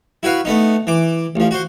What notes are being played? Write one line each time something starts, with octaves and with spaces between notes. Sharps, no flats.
E4 F#4 B4 F5
A3 B3 D#4
E3 D6
A1 F3
F#4 C5